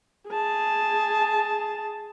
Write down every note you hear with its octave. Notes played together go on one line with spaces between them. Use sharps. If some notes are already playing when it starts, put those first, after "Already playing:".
G#4 A5